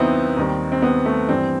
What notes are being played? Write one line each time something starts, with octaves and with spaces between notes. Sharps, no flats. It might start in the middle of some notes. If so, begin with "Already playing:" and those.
Already playing: D#2 D#3 F#3 B3 C4 D#4 E4
D#2 D#3 G3
C4
B3
A3
G2 E3 G3 C4